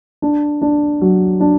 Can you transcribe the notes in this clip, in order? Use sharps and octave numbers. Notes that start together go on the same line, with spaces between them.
D4
D4
F#3
D4